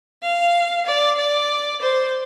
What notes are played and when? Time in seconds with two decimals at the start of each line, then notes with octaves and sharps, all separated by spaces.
0.22 F5
0.86 D5
1.17 D5
1.81 C5